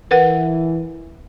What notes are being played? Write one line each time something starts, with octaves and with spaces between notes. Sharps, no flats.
E3 A#4 B4 F#5